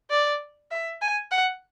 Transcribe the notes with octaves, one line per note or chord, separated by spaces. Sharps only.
D5
E5
G#5
F#5